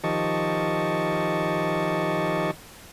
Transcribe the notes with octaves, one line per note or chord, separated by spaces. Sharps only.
D#3 F3 G4 D#5 A5 C#6